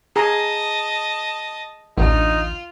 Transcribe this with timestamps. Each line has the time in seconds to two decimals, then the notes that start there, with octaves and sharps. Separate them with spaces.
0.16 G#4 D#5 A5 A#5
1.98 A1 D2 D#4 F4